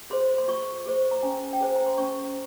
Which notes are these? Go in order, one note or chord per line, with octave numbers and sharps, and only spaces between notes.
G#4 C5 C6
C6
F4 C#6
G#4 C5
A#5
C#4 G#5
G5
G#4 C5 G#5
A#5
C6
C#4 C#6